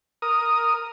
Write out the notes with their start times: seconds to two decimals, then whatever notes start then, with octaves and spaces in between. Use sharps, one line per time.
0.22 A#4 D#6